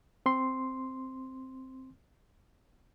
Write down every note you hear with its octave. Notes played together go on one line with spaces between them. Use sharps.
C4 C6